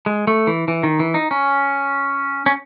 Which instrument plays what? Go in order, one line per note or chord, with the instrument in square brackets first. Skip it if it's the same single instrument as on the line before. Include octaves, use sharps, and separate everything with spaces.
[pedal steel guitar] G#3
A3
E3
E3
D#3
E3
D#4
C#4
C#4